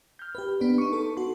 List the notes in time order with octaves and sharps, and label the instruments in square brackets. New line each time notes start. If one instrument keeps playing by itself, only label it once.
[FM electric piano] F6 G6
G4 B4
B3 D4 B4
D#4 C#6
A4 C#6
F#4 C6